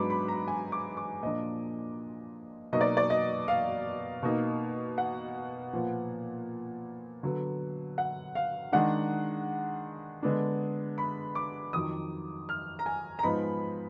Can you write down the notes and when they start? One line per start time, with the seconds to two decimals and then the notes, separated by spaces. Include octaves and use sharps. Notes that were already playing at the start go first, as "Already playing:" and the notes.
Already playing: G#2 F#3 B3 D4 B5 D6
0.10 B5
0.28 A#5
0.48 G#5
0.72 D6
0.97 D6
1.23 A#2 F3 A#3 D4 D#5
2.73 B2 F#3 A#3 D#4 D#5
2.81 D5
2.97 D5
3.10 D#5
3.48 F5
4.23 B2 A#3 D#4
4.98 F#5
5.73 A#2 F3 B3
7.23 D3 F#3 B3
7.98 F#5
8.35 F5
8.72 D#3 G#3 D4 F#5
10.23 D3 G#3 B3 D4
10.98 B5
11.35 D6
11.73 F2 D#3 F#3 D#6
12.49 F6
12.79 A#5
12.86 G#5
13.19 A#5
13.23 G#2 F3 B3 D#4 B5